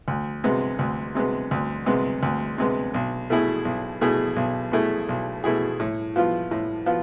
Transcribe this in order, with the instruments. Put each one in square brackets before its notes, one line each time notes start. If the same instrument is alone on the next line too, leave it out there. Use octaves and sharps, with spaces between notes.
[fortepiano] D2
C3 G#3 B3
D2
C3 G#3 B3
D2
C3 G#3 B3
D2
C3 G#3 B3
B1
B2 A3 E4 G#4
B1
B2 A3 E4 G#4
B1
B2 A3 E4 G#4
B1
B2 A3 E4 G#4
A2
F3 B3 F4
A2
F3 B3 F4